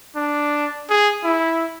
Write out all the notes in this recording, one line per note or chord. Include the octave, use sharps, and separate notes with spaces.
D4
G#4
E4